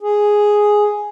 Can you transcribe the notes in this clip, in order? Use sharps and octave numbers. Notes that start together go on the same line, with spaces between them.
G#4